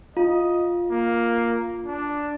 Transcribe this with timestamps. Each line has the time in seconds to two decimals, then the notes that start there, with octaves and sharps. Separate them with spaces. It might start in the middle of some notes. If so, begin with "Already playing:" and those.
0.17 F4 D#5
0.91 A#3
1.86 D4